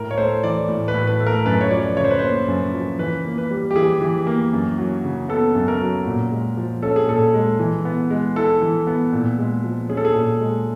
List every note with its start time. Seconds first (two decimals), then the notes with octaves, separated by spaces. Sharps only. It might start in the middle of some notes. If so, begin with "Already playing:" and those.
Already playing: A2 A#4
0.11 C#5
0.18 A3 C5
0.43 E3 D5
0.68 A2
0.88 B4
0.94 A2
1.07 B4
1.20 A3
1.27 A#4
1.46 F#2 B4
1.61 C#5
1.71 F3 D5
1.97 C#3 C#5
2.04 C5
2.11 B4
2.19 A#3 C5
2.48 F#2
2.73 F3
2.99 E3 B4
3.25 A#3
3.38 B4
3.51 G3
3.71 G4
3.76 E3 G#4
4.01 E3
4.27 A#3
4.53 F#2
4.78 F#3
5.04 C#3
5.29 B3 A4
5.55 F#2
5.68 A#4
5.81 F#3
6.06 A#2
6.31 G#3
6.57 F3
6.82 C#4 A4
6.96 G#4
7.08 A#2 A4
7.34 G#3
7.59 E3
7.85 B3
8.10 G#3
8.36 E4 A4
8.62 E3
8.87 B3
9.13 A#2
9.38 G#3
9.64 F3
9.89 C#4 G#4
9.97 A4
10.05 G#4
10.15 A#2
10.40 G#3